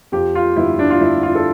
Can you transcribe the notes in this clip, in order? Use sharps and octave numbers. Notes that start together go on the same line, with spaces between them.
F2 G4
F4
G1 E4
D4
F4
G1 E4
F4
A4